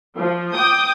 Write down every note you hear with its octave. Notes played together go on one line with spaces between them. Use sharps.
F3
G5 D6 D#6 G6